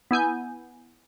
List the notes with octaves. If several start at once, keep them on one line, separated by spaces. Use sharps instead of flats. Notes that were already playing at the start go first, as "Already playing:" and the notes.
B3 E4 G#5 G6